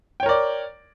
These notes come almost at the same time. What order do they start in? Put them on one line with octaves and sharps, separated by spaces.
G5 C#5 A#4 D5